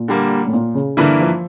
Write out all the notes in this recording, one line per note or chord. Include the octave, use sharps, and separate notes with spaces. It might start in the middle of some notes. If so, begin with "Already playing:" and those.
Already playing: A#2
D3 G3 A#3
A2
A#2
C#3
G2 D3 E3 A#3 E4
F3